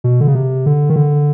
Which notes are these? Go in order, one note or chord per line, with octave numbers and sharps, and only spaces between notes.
B2
D3
C#3
C3
D3
D#3
D3